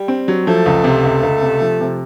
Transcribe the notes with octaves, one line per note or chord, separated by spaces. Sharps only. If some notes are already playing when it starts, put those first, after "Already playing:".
Already playing: G3
C4
F#3
F3 A3
C#2
C3
C#2
C#2
C3
F3
C3